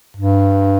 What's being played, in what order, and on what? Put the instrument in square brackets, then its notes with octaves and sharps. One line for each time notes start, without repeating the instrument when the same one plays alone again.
[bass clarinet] G2